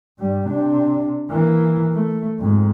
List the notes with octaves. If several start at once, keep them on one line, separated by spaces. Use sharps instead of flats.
G2 G3
C3 D4
E3 A#3
A3
F2 G#2